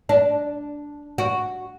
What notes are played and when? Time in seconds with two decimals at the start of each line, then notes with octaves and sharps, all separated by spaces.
0.09 D4
1.18 F#4